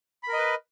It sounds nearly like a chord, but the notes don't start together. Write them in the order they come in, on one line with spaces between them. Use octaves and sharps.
B5 A#4 D#5 B4